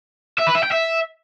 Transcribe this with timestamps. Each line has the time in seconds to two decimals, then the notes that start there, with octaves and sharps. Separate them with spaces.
0.39 E5
0.47 B4
0.55 E5
0.63 G5
0.72 E5